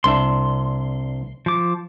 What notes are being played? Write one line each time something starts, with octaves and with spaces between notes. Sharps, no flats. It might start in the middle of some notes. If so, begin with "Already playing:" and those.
C2 D4 E5 C6
F3 D6